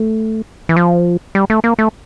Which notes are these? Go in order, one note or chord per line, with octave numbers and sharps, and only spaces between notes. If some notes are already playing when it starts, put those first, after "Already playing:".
Already playing: A3
E3
F3
G3
A3
A#3
A3